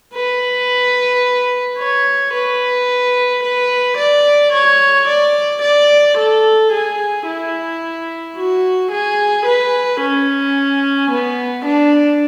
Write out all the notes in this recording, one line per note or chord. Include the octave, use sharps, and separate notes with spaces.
B4
C#5
B4
B4
D5
C#5
D5
D5
A4
G#4
E4
F#4
G#4
B4
C#4
B3
D4